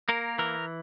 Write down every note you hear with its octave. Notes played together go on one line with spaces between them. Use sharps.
A#3 A#4
E3 A#4